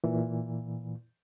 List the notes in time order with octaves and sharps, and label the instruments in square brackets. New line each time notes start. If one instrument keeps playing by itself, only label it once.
[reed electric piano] A#2 E3